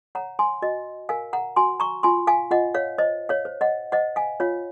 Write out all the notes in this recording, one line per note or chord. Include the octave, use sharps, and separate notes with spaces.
C#5 F#5 A#5
G#5 C6
F#4 D#5
A#4 F5 G#5
F#5 A#5
F#4 G#5 C6
A#5 C#6
F4 G#5 C6
F5 G#5
F4 D#5 F#5
C#5 F5
C5 D#5
C#5 F5
C5
D#5 F#5
C5 D#5 F#5
F5 G#5
F4 C#5 F5